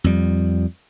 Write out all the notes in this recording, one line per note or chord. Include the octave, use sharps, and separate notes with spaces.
F2 G3